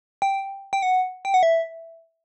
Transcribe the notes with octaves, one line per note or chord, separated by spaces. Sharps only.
G5
G5
F#5
G5
F#5
E5